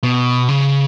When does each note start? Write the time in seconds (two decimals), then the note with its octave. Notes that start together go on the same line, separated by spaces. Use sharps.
0.03 B2
0.48 C#3